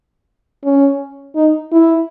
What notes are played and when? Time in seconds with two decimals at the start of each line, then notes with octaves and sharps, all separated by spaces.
0.64 C#4
1.36 D#4
1.72 E4